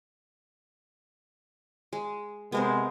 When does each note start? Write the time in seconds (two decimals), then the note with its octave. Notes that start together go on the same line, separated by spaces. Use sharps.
1.93 G#3
2.52 C3 G#3 B3 A#4 C5